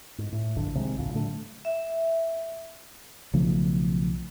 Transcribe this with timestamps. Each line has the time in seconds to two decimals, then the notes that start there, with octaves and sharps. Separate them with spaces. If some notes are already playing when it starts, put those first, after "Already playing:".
0.18 G#2
0.32 A2
0.56 E1 A#1 G2 D3
0.74 A#1 C3 D#3 G#3
0.97 G#1 D#2 A#2 D3
1.14 A2 D3 F#3 A3
1.65 E5
3.33 B1 C#3 F3 A3